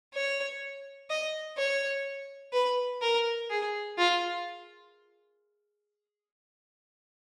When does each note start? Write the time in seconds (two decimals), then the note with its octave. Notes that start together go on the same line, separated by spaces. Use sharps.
0.14 C#5
1.10 D#5
1.57 C#5
2.53 B4
3.02 A#4
3.50 G#4
3.98 F4